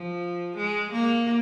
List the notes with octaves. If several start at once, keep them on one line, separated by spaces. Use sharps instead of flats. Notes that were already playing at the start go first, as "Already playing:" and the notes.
Already playing: F3
G#3
A#3